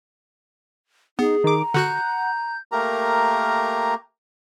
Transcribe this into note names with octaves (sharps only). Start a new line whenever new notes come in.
B3 D#4 G#4
D#3 A#5 D6
D3 F#4 F#5 F#6 G6
A3 A#3 G4 A#4 A#5